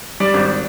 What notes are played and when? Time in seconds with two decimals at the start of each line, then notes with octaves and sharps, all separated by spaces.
0.20 G3 D5
0.34 G#1